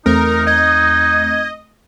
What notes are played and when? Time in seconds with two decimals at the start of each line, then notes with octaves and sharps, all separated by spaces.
0.06 E2 A3 C4 D#4 A#4
0.47 D#5 G#6